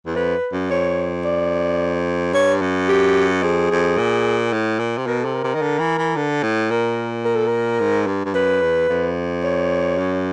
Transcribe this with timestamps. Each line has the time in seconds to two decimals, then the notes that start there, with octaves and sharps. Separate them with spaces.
0.06 E2
0.16 F2 B4
0.52 F#2
0.70 F2 C#5
1.25 D5
2.33 G2 C#5
2.61 F#2
2.89 G4
3.43 F2 G#4
3.71 F2
3.98 A#2
4.53 A2
4.79 A#2
4.97 C3
5.07 B2 A#4
5.20 C3 A4
5.34 A#4
5.44 C3
5.55 D#3
5.62 D3
5.79 E3
5.98 E3
6.16 D3
6.43 A2
6.70 A#2 A#4
7.25 A#4
7.36 A4
7.47 A#4
7.80 G#2
8.07 G2
8.25 G2
8.34 F#2 B4
8.62 E2
8.89 F2
9.44 C#5
9.98 F#2